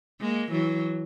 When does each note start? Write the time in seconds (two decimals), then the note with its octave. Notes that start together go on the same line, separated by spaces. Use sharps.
0.21 G#3 A#3
0.52 E3 F#3